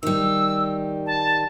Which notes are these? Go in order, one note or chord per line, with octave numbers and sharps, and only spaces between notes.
D#3 G3 E6
A5